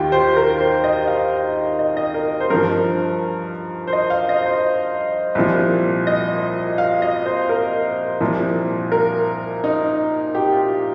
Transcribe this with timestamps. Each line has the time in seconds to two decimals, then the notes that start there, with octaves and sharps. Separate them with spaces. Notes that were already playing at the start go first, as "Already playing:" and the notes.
Already playing: D#2 D#3 F4 G4
0.12 C5
0.36 A#4
0.61 C5
0.84 D#5
1.07 F5
1.79 D#5
1.97 D#5
2.14 A#4
2.40 C5
2.50 G2 F3 A#4
3.87 C5
3.93 D#5
4.10 F5
4.29 D#5
4.46 C5
5.35 C2 A#2 F3
6.07 D#5
6.78 F5
7.02 D#5
7.26 C5
7.49 A#4
8.21 C2 A#2 F3
8.92 A#4
9.64 D#4
10.35 G4
10.52 F4